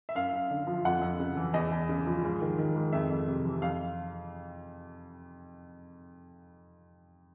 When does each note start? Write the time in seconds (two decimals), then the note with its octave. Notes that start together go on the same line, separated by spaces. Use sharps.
0.09 E5
0.15 F#2 F5
0.33 F#2
0.51 D3
0.67 F3
0.85 F2 F#5
1.01 F2
1.19 C#3
1.37 E3
1.53 E2 D#5
1.72 E2
1.89 C#3
2.06 F3
2.24 G#2
2.41 D#3
2.58 D#3
2.75 G#2
2.93 F2 E5
3.10 F2
3.27 C3
3.45 E3
3.62 F2 F5